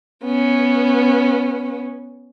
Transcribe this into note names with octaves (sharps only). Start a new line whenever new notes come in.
B3 C#4